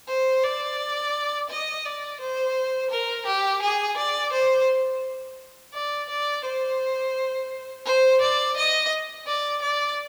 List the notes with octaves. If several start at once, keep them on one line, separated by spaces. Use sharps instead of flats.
C5
D5
D#5
D5
C5
A#4
G4
G#4
D5
C5
D5
D5
C5
C5
D5
D#5
D5
D5